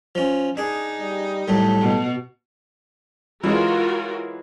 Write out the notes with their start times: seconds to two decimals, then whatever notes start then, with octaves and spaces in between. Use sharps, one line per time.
0.15 F3 C#4
0.57 D4 D#4 G#4
1.01 G3
1.48 A2 F#3 G3 A4
1.81 B2
3.43 E3 F#3 G#3 F4 F#4 A#4